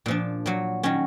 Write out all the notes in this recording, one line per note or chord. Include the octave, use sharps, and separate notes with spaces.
A#2 F3 D4
A#2 F#3
D#3 F#3 C#4